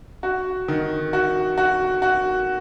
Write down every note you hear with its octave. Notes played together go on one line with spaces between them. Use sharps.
F#4
D#3
F#4
F#4
F#4